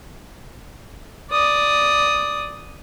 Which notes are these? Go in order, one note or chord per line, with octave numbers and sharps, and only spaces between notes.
D5 D#6